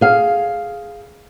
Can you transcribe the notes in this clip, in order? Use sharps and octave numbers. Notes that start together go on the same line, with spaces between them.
G#4 F5